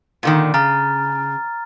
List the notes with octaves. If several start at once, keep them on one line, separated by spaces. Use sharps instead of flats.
A#2 D3 D#3
C#3 A#5 F6 A6